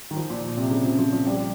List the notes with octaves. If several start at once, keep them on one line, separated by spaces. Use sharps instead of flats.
D#3
F3
A#2
A#2
C3
C#3
F3
F3
F3
G3
G3